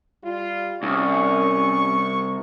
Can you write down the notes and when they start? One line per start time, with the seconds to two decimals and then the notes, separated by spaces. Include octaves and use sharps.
0.24 G3 F4
0.83 C2 C#4 C#6